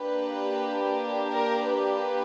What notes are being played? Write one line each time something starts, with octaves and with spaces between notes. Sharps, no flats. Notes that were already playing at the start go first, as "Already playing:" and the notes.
Already playing: A#3 D4 G4 B4
A#4
B4